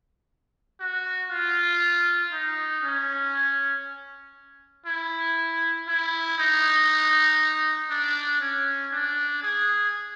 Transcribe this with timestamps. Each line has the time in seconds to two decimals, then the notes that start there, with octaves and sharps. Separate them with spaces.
0.80 F#4
1.31 F4
2.32 D#4
2.83 C#4
4.86 E4
5.88 E4
6.38 D#4
7.90 D4
8.40 C#4
8.92 D4
9.42 G#4